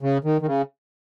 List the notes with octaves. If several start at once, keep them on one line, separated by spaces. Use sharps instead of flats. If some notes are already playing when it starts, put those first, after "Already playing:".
C#3
D#3
D#3
C#3